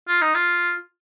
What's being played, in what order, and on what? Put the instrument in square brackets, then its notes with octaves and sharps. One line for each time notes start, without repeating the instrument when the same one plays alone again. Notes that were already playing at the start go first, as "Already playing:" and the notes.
[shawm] F4
D#4
F4